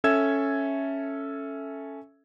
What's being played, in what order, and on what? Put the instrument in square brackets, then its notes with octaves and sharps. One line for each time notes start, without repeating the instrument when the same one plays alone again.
[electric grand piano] C#4 A4 E5 E6 G#6 E7